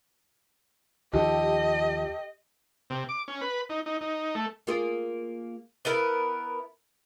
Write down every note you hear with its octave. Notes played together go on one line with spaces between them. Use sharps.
D#2 D#3 F3 G4 A4 D#5
C3
D6
C#4
B4
D#4
D#4
D#4
A3
A#3 F4 G#4
B3 E4 A#4